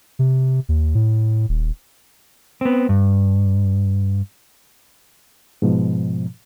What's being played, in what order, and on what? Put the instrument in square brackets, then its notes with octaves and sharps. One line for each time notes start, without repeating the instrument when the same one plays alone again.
[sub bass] C3
D#2
A2
D#1
[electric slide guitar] B3 C4
G2
[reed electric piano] G#2 B2 F3